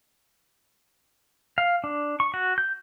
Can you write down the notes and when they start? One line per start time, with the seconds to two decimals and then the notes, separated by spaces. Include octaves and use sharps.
1.58 F5
1.84 D4
2.20 C#6
2.34 F#4
2.58 G6